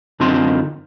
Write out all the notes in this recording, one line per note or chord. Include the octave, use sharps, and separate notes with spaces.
F#2 D3 C4 D#4 F4 C6